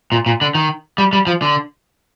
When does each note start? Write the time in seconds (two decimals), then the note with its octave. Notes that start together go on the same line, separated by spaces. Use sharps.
0.12 A#2
0.26 A#2
0.41 D3
0.55 D#3
0.98 G3
1.13 G3
1.27 F3
1.42 D3